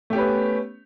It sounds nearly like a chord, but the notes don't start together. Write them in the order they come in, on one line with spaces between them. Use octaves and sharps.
A3 G4 C#4 B4 B3